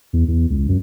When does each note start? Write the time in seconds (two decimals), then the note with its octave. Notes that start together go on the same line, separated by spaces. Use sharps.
0.13 E2
0.28 E2
0.50 C#2
0.68 F#2